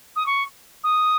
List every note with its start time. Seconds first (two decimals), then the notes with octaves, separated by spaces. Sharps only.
0.16 D#6
0.26 C#6
0.84 D#6